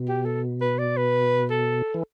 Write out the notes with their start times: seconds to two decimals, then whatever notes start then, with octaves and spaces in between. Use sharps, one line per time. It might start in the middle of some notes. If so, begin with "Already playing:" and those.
Already playing: B2
0.08 G4
0.25 A4
0.61 B4
0.79 D5
0.97 B4
1.50 A4
1.94 E3